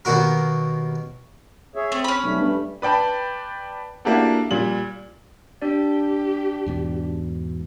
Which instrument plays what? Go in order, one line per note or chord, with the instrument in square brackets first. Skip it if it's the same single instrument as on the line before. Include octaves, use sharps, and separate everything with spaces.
[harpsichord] D#2 B2 F#4 A#4
[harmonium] G#4 C#5 E5
[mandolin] A3 [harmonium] C4
[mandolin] C#4 B5
[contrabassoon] B1 [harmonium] G3 A3
[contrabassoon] G2
[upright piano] B4 D5 G5 A5 B5
A#3 D4 E4 F#4 G4 A4
A#2 G3 F#7
[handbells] D4 D5 [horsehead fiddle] G4
[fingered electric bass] E2 G#2 B2